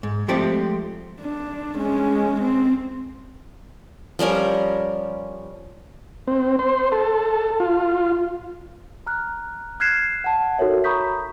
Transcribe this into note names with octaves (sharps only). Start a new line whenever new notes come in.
G#2
F3 G#3 A3 C4 G4 D5
D4
G#3 C#4
C4
F3 G3 C#4 A#4
C4
C5
A4
F4
A#5 F6 F#6
F6 F#6 G#6 B6 C7 E7
F#5 A5
D#4 F#4 A4 A#4 C#5 E5
A#5 B5 C#6 D#6 G6 B6